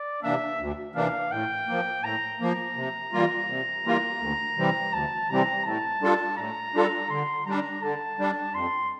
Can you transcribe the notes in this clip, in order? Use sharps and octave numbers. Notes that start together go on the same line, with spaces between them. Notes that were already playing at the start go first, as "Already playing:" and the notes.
Already playing: D5
C3 E3 A#3 D4 E5
D2
C3 E3 A#3 D4 F5
A2 G5
F3 A#3
A2 A#5
F3 A#3
C3
E3 G3 A#3 F4
C3
E3 G3 A#3 F4
D2
C3 E3 G3 C4
D2 A5
C3 E3 G3 C4 A#5
A2 A5
G3 D4 F4 A4
A2 A#5
G3 D4 F4 A4
D3 C6
G3 D4 A#5
D3 A5
G3 D4
F2 C6